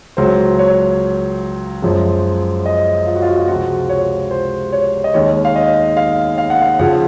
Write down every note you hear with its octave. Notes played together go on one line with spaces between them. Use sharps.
C#2 C#3 F#3 C5
C#5
F#2 F3 G#3
D#5
F4
F#4
F4
F#4
F4
C#2 C3 F3 G#3 F#4
C#5
C5
C#5
D#5
D#2 D#3 G#3 C#5
F5
D#5
F5
F5
F#5
F5
F2 C#3 F3 F#5